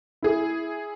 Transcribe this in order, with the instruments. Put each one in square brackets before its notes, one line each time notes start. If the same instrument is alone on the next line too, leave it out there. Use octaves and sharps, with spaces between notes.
[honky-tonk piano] E4 G#4